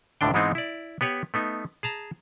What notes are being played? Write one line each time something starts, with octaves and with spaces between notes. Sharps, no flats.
C#2 A2 D3 D4 G5
G#2 E3 G#3 B3 C4 D#4
E4 D5
B3 G4 B4 C#5
A3 B3 D#4
G#4 A5 A#5